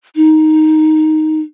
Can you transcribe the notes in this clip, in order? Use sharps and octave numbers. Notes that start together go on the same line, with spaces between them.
D#4